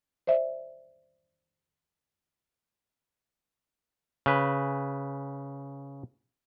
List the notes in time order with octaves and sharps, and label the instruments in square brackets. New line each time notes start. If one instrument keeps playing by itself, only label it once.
[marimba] C5 D5 E5
[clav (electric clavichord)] C#3 B4